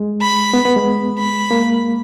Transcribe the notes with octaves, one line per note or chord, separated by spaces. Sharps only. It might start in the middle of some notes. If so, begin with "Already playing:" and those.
Already playing: G#3
B5
B3
B3
G#3
B5
A#3